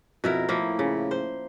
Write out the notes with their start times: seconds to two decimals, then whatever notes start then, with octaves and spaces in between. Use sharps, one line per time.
0.24 F2 B2 E4 A#4
0.49 A2 F3 A#3 E4
0.79 C#3
1.11 C5